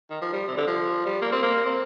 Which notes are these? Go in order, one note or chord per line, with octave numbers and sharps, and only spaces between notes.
D#3
F3
G3
C3
D3
F3
G3
A#3
C4
A#3
C4